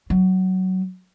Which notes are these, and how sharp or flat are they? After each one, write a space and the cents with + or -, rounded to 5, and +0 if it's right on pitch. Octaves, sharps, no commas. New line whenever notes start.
F#3 +15